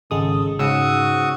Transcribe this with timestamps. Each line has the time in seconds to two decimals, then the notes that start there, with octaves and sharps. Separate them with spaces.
0.11 G#1 C#3 G#3 A4 D#6
0.59 G#2 C#3 F#4 C#6 D#6 E6